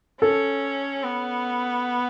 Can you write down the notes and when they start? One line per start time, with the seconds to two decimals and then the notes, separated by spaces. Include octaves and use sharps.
0.21 C#4 A4
1.04 B3